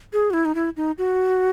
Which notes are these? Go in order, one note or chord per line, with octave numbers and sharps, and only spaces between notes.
G#4
F#4
E4
D#4
E4
D#4
F#4